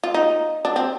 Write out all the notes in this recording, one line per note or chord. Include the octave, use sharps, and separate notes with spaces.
F4
D#4
D4
C4